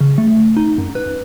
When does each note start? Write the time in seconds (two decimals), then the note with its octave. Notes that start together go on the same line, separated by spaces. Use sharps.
0.01 C#3
0.18 A3
0.57 D#4
0.78 F#2
0.95 B4